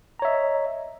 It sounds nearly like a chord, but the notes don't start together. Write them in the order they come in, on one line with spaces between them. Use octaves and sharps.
A#5 C#5 E5 D#5